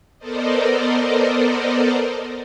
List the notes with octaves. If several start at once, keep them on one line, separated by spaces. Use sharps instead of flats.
B3 A4 A#4 C5 D5 D#5